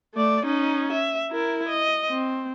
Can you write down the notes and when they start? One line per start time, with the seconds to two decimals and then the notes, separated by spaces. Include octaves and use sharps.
0.15 A3 D5
0.45 C#4 D#4
0.93 E5
1.31 E4 A#4
1.69 D#5
2.09 C4